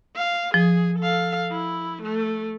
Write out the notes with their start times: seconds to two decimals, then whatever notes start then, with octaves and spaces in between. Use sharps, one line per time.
0.16 F5
0.54 F3 G#4
0.98 A4 F5
1.51 E4
2.02 A3